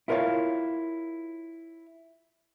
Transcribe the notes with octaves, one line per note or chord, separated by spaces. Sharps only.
E4 F4 A#4 B4 C#5 F5